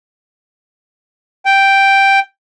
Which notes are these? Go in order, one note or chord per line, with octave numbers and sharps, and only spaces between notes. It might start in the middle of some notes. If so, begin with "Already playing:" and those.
G5